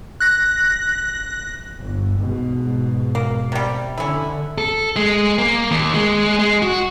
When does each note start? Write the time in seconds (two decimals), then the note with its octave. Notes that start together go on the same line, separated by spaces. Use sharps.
0.20 F#6 A#6
1.80 G1
2.18 G#2 B2
3.15 A#3
3.52 C3 G3
3.98 D3 C#4 E4
4.58 A4
4.96 G#3
5.38 A#3
5.71 D#2
5.94 G#3
6.39 G#3
6.62 F#4